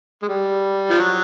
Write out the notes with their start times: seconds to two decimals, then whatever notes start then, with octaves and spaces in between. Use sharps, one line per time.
0.22 G#3
0.29 G3
0.90 F3
0.99 F#3